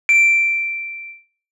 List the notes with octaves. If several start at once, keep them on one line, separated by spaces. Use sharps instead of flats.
D7